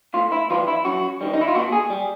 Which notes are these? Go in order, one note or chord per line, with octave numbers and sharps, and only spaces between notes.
A2 F4
E4
E3 G3 F4
E4
F#2 F#4
D#3 G3
D#4
E4
F4
A#2 F#4
G#4
G3